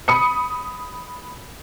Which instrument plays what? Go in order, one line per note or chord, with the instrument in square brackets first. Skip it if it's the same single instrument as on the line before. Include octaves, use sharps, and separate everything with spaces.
[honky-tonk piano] B5 D#6 C#7